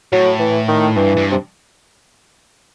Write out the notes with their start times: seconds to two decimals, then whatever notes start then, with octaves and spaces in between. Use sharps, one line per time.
0.12 A2 F#3
0.39 E3
0.68 D#3
0.96 G2 E3
1.17 G2
1.32 C3